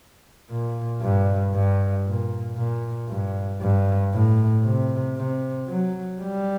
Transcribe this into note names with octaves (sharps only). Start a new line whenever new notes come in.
A#2
G2
G2
A#2
A#2
G2
G2
A2
C3
C3
F#3
G3